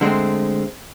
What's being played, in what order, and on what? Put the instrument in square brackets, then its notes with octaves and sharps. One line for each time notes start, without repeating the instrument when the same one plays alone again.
[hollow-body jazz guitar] D3 G#3 A3 C4